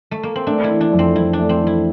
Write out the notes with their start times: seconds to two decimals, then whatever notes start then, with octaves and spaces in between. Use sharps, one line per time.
0.11 A3
0.23 A#3
0.36 C4
0.47 A3 D4
0.64 E4
0.70 E3
0.81 D4
0.93 F2
0.99 C4
1.15 F2 E4
1.33 D4
1.39 A3
1.49 C4
1.61 E3
1.67 E4